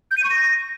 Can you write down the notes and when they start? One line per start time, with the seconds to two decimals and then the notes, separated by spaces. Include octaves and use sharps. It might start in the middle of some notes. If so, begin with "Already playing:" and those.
0.11 G6
0.17 D#7
0.24 C#6
0.30 A#6